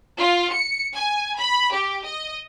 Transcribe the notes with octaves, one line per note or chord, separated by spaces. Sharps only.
F4
C#7
G#5
B5
G4
D#5